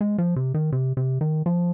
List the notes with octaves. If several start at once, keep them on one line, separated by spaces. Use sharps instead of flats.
G#3
F3
C3
D#3
C3
C3
D#3
F3